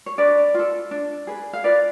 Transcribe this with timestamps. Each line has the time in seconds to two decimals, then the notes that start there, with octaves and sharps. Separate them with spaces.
0.06 C#5
0.18 D4 B4 D5
0.54 F4 A4
0.91 D4
1.27 G#4 B4
1.53 F5
1.64 F4 B4 D5